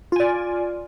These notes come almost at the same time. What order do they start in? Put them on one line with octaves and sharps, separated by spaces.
F4 G#5 D5